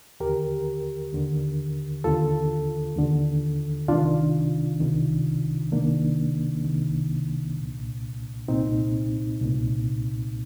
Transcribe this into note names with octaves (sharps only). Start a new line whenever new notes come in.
D#2 D3 G4 A#4
D#2 D3
D#2 D3 F4 A4
D#2 D3
C2 C3 D#3 D4 F4
C2 C3 D#3
C2 C3 D#3 A#3 D4
C2 C3 D#3
C2 A#2
C2 A#2 C4 D#4
C2 A#2